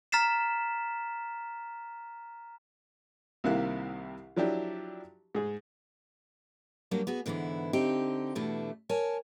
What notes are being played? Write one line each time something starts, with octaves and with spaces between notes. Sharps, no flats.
A#5 F6 A6 B6 C7 E7
C2 C3 D#3 A#3 E4 F#6
F3 F#3 D4 E4 G4
G#2 G#4
F#3 G3 A#3 D4 F#4
B3 F#4 G#4
G#2 D3 E3 B3 E4
D3 C4 D#4 G4
E2 B2 A3 D4 E4
A#4 C#5 G#5 A5